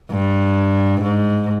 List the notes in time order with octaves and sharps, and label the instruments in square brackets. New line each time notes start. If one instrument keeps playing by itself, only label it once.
[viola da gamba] G2
G#2